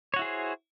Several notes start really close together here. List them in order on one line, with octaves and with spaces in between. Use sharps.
C#5 F#4 E4 G#4 C5